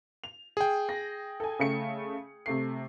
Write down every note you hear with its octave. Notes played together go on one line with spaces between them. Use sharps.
F7
G#4 G5
A#6
A4 G#5
C#3 A3 C#7
C3 A3 C7